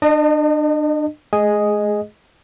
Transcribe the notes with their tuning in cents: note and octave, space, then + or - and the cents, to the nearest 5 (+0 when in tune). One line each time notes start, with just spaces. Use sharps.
D4 +30 D#5 -25
G#3 +45 G#4 +0 D#5 +0